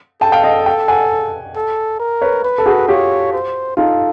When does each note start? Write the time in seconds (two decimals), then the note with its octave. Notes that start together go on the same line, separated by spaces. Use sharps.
0.21 A4 G5 A5
0.32 F5 G5
0.43 D#5 F5
0.66 F5 G5
0.88 F#5 G#5
1.56 A4
2.00 A#4
2.22 B4 C#5
2.44 B4
2.58 A4
2.66 F#4 G#4
2.88 F4 G4 C#5
3.33 C5
3.77 D#4 F4 A4